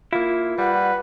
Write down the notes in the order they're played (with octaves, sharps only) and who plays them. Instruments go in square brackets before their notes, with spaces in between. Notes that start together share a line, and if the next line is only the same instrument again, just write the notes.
[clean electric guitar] A#3 E4 [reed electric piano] F4
[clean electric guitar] G3 [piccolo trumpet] B4 [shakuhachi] F#5